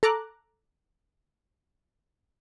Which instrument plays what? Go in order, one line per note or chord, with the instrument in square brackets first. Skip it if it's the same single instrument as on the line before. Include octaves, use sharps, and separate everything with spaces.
[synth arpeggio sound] A4 A#5 D6 F#6